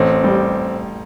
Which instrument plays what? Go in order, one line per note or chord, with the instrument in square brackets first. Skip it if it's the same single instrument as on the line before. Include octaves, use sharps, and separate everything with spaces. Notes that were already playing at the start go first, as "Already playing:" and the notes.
Already playing: [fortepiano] A1 [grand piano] C4
[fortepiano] G3